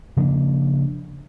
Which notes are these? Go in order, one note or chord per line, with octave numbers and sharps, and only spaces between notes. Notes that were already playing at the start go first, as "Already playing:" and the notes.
C#3 F3 A#3 D4